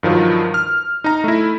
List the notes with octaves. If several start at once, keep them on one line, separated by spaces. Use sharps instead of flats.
G2 D#3 F3 F#3
F6
D#4 A#5
A3 E4